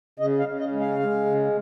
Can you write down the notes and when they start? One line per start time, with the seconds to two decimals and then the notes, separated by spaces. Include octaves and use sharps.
0.19 C#3 D#5
0.39 F5
0.47 C#3
0.59 D#5
0.72 G#3
0.80 F5
0.99 G#3
1.26 C#3